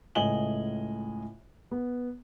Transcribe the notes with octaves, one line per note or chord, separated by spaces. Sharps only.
C#2 A2 D#5 G#5 F#7 G7
B3